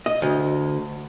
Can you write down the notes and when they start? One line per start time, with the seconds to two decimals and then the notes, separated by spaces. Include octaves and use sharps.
0.06 D#5
0.22 D2